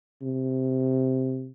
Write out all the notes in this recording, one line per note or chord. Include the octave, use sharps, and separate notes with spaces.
C3